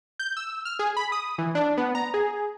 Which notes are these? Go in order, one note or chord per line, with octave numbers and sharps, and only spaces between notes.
G6
E6
F6
G#4
B5
D#6
E3
D4
B3
A#5
G#4